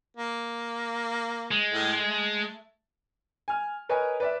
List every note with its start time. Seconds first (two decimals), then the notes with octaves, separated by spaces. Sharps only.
0.17 A#3
1.51 G#3
1.73 A2
2.06 A3
3.48 G#5 F6
3.89 A#4 B4 C#5 D#5 G#5
4.20 B4 D5 E5